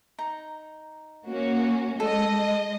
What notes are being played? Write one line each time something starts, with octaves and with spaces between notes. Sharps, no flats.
D#4 A#5
A#3 C#4 F#4
G#3 A4 D#5